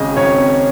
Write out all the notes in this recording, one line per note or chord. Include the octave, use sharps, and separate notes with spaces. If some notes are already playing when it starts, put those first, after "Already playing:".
Already playing: G#1 C#3 D#5
G#1 C#5